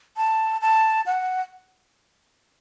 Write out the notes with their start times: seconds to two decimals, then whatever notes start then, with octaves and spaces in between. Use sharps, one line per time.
0.17 A5
0.61 A5
1.06 F#5